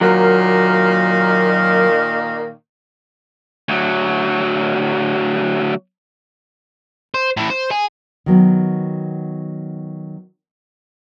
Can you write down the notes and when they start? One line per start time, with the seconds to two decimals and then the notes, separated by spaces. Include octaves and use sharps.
0.01 A#2 D#3 F#3 A#3
3.68 D2 F#3
7.14 C5
7.37 A2 E3
7.50 C5
7.71 G#4
8.26 D#3 F#3 B3